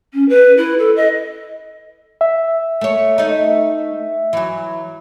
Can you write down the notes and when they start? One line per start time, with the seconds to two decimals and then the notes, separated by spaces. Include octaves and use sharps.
0.13 C#4
0.29 B4
0.57 E4
0.79 A4
0.96 D#5
2.21 E5
2.81 A3 C#5
3.18 A3 D#4
4.33 E3 F#3